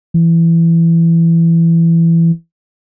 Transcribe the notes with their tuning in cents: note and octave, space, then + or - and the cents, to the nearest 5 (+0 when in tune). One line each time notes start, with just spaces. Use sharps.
E3 +15